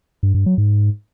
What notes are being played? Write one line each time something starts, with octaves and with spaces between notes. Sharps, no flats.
G2
G2
F#3
G#2